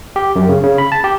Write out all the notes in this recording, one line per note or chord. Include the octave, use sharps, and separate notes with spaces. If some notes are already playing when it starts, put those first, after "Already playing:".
G4
F#2
C#3
C#3
B5
A5
G4